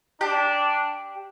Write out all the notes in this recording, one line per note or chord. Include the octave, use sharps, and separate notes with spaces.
D4 G4